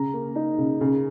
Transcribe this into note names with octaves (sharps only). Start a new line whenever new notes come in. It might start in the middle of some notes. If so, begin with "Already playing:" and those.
Already playing: C#3 A#5
A#3
D#4
C#3
C#3